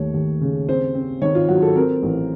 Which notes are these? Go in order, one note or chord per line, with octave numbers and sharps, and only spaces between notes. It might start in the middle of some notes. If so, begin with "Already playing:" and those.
Already playing: D#2 A3 C#5
D#2
C#3
C4 C5
C4
D#3 C#5
F4
F#3 F#4
A4
C4 A#4
A1